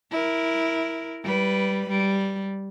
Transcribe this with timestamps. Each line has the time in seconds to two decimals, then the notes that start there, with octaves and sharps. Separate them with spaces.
0.11 E4 A#4
1.23 G3 B4
1.89 G3